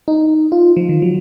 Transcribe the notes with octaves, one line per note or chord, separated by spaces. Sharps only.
D#4
F4
F3
D#3
F#3